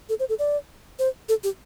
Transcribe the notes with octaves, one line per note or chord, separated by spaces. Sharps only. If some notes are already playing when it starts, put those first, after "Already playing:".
A4
C5
A4
D5
C5
A4
G4